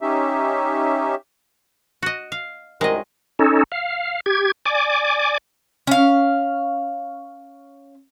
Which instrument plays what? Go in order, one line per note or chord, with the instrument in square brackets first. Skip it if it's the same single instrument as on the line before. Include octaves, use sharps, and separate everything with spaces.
[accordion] C#4 D#4 G4 E5
[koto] F#4 D#5
F5
[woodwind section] C2 F#2 D#3 [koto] G#3 D#5
[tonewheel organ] C#4 D#4 A4
F5
G4 G#6
D5 G#5 D6
[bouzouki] C#4 F5